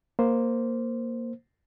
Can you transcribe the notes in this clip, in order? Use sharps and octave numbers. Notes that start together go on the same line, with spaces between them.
A#3 C5